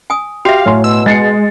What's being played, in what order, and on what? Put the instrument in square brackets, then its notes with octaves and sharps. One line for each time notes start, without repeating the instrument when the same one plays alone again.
[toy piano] G#5 D#6
[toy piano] F#4 E5 [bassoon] G4 [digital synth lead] F5
[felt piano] A2 G#5 C6 [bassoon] F#3
[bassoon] B2 [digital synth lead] E6
[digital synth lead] G#3 [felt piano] A6 C7 C#7